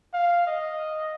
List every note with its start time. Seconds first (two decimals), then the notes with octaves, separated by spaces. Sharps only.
0.14 F5
0.47 D#5